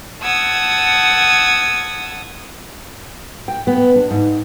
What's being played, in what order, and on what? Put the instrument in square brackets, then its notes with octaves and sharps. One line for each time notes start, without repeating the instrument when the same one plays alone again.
[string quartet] F#5 A5 D#6 E6 G#6
[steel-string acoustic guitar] G5
B3
D4
G#2